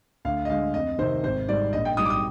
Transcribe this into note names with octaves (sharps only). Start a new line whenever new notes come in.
D2 F5
D#5
D3 G#3 F5
F2 D#5
C3 D#3 C5
G#1 C5
G#2 G3 D5
A#1 D#5
G5
G#2 G3 D#6
D6
D#6